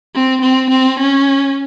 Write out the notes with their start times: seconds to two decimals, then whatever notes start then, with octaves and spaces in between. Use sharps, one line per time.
0.15 C4
0.42 C4
0.70 C4
0.99 C#4